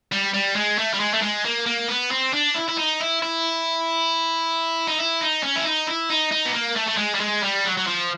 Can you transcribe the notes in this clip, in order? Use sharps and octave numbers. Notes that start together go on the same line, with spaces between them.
G3
G3
G#3
A3
G3
G#3
A3
G#3
A#3
A#3
B3
C4
D4
E4
E4
D#4
E4
E4
D#4
E4
D#4
C#4
E4
D#4
E4
D#4
D#4
B3
A#3
A3
A3
G#3
G3
G#3
G3
F#3
F#3
F3